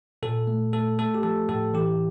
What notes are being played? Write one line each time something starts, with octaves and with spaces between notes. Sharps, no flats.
A#2 A4
A3
A3 A4
A3 A4
G4
F3 A4
A2 A4
E3 G4